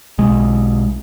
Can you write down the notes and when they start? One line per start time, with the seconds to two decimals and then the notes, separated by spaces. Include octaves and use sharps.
0.18 B1 G#3